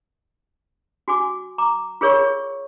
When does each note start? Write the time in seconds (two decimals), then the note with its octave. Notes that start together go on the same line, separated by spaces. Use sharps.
1.08 F#4 G#5 D6
1.58 A#5 D6
2.01 F4 G#4 A#4 C#5 D5 C#6
2.19 G#4